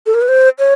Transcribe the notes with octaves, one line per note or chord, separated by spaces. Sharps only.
A4
A#4
B4
C5
C#5